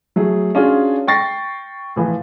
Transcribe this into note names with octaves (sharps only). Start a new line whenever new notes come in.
F#3 A3 G#4
C#4 D4 F4 F#4 G#4
G5 C#6 A6 A#6 C7
A2 E3 F3